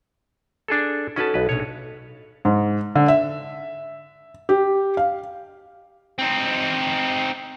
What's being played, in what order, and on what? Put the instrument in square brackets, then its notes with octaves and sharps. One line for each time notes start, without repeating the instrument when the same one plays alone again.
[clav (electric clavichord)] D4 G#4 A4
[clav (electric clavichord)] C#4 B4 A5 [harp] D#4 F#4 A4
[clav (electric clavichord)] B1 B4
[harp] A#1 B2 [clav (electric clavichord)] C#5
[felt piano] G#2
D3
E5
G4
F5
[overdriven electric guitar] C4 D#4